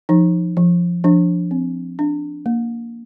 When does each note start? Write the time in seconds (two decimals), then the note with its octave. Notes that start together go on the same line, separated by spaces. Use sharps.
0.09 F3 D#4
0.57 F3
1.04 F3 D4
1.51 C4
1.99 D4
2.46 A#3